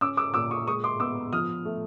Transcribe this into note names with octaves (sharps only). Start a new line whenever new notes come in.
C#4 D6 E6
D6 E6
A#2 D6 E6
C#6 D#6
G#3 C#6 D#6
C6 D6
B3 D6 E6
F3 D#6 F6
A3